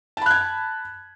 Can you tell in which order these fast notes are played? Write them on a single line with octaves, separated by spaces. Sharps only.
A5 B5 F#6 G#6